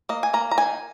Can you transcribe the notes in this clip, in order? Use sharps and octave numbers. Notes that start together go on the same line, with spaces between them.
A#3 D#5
G#5
A#3 A#5
A#5
D#3 G#5